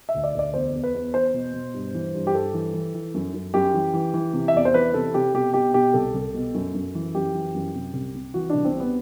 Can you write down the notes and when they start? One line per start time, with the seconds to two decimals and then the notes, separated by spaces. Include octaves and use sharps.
0.09 E5
0.14 D2
0.24 D5
0.34 D2 D5
0.54 E2 C5
0.74 E2
0.83 B4
0.94 E2
1.14 E2 C5
1.34 B2
1.54 B2
1.74 G2
1.94 E3
2.15 G2
2.27 G4
2.34 G2 A4
2.54 E3
2.74 E3
2.94 E3
3.14 F#2
3.34 F#2
3.54 F#2 G4
3.73 E3
3.93 E3
4.14 E3
4.33 C3
4.48 E5
4.54 E2 D5
4.65 C5
4.74 E3 B4
4.94 C3 A4
5.14 C3 G4
5.34 B2 G4
5.54 B2 G4
5.74 B2 G4
5.94 C2 A4
6.14 C2
6.34 B2
6.54 F#2
6.74 F#2
6.95 E3
7.14 F#2 G4
7.34 E3
7.54 F#2
7.74 C3
7.94 C2
8.15 C3
8.34 E3 F#4
8.50 C2 D4
8.65 C4
8.74 C3
8.80 B3